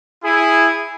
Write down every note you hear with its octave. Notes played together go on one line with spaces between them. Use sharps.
E4 G#4